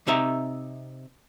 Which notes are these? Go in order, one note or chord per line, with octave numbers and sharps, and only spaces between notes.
C3 D#4 E5 A#5